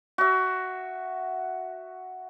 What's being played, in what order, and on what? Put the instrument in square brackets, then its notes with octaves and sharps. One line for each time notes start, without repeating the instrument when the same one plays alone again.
[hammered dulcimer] F#4 E5